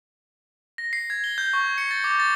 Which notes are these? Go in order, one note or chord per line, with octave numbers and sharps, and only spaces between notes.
A#6
C7
G#6
G7
G6
C#6
C#7
A6
D6
A6